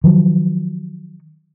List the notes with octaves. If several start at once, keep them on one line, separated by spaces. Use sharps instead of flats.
D#3 F3 F#3